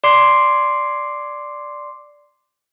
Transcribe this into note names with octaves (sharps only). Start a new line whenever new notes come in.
D5 C6 D6 C7